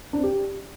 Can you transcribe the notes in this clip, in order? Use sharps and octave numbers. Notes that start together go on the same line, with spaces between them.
D4
C4
G4